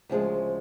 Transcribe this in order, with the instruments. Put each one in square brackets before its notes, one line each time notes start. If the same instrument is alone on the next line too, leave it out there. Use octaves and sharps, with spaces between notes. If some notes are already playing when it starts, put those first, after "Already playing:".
[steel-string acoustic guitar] D2 C#3 F3 G#3